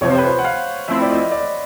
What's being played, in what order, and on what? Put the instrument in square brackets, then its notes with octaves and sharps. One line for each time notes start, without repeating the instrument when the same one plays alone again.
[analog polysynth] F2 C3 F3 [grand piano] C#5
[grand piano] C5
B4
C5
F#5
F5
[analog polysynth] F3 A3 C4 E4 [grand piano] E5
[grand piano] D5
D#5
D5